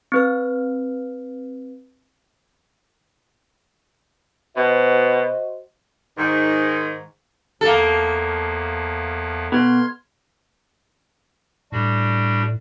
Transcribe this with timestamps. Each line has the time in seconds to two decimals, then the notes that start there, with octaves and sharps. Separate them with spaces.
0.12 C4 B4 F6
4.57 B2 F#4 C5 D#5
6.17 G#2 D#3
7.61 E2 F3 A#3 A4
9.52 B2 C6 F6 G#6
11.72 A2 G3 D4 F#4